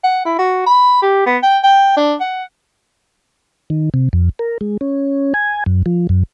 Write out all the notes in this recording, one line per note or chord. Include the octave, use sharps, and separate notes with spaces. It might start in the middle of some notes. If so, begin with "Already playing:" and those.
F#5
E4
F#4
B5
G4
B3
G5
G5
D4
F#5
D#3
C3
F2
A#4
G#3
C#4
G#5
F#2
F3
F#2